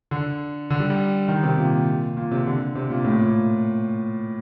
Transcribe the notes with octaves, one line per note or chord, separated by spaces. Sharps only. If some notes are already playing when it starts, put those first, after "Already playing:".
D3
D3
G3
G3
D#3
C3
A#2
A#2
C3
D3
C3
A#2
A2
A#2